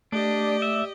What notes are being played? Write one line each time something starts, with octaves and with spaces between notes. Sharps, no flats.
A3 D4 G4 D5 D#5
E5